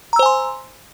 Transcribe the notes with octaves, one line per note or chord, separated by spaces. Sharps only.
C5 G#5 A#5 C6 E6